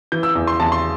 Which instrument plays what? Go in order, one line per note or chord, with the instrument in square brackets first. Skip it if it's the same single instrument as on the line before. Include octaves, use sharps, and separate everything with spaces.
[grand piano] E3 G6
E6
E2
C6
E2 A5
C6